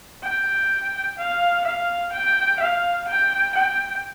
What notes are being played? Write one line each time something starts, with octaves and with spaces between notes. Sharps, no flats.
G5
F5
F5
G5
F5
G5
G5